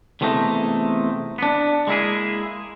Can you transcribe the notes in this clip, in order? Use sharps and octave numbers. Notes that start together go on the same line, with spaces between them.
E2 C3 A3 A#3 D#4
B3 D4
G#3 A#3 E4 G#4